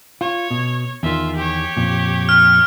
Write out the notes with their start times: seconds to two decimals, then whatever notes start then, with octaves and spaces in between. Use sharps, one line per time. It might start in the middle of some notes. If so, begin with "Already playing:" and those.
0.21 F4 C#5
0.51 B2
1.03 E2 D#3 F4 E5
1.36 G4 C#5
1.77 F2 A#2
2.29 F6